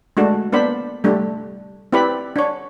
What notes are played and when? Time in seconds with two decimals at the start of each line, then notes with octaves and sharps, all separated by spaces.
0.17 G#3 A3 D4 F#4
0.52 A#3 B3 D4 C5 D5 B5
1.04 G3 A3 D4
1.92 C4 E4 G4 B4 D5 B5
2.36 D4 C#5